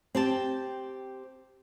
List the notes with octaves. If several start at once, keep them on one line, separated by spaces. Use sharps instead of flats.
C4 G4 A5